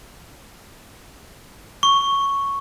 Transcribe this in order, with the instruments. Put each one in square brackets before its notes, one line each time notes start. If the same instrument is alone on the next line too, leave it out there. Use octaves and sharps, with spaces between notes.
[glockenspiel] C#6